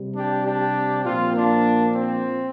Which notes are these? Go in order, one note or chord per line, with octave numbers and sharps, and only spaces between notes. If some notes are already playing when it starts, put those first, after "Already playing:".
Already playing: C3 G3
D4 G4
D4 G4
A#2 F3 C4 F4
A#3 D4
C4